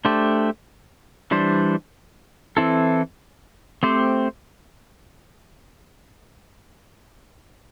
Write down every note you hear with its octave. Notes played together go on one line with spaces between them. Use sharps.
A3 D4 G4 C5
E3 G3 D4 C5
E3 C4 E4 A4
A3 C4 G4 C5